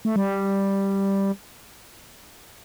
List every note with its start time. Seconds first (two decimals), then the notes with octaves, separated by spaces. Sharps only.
0.05 A3
0.16 G3